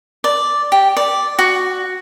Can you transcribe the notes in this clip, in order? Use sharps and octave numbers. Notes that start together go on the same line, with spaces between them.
D5
G4
D5
F#4